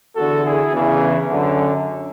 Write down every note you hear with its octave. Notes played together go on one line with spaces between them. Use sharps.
E2 D3 F#4 A4
E4 G#4
E2 C#3 E3
F#2 D3